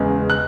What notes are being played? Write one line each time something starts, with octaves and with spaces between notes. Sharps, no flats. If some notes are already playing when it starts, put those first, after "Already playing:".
Already playing: E2 C#3 G#3
F#6